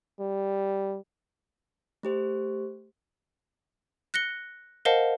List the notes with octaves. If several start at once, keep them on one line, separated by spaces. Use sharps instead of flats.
G3
A3 G4 C5
F#6 A#6 C#7 G7
A#4 C5 D#5 F5 F#5 A5